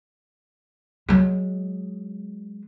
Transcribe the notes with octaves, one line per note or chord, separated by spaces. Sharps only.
F#3 G#3